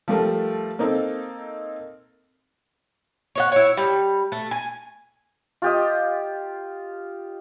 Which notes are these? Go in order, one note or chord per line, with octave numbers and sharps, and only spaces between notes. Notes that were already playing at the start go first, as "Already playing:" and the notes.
F3 G3 A3 A#4
A#3 C4 D#4 A4
C#5 D#5 F#5
E4 C#5
G3
A3
G#5
F4 G4 D#5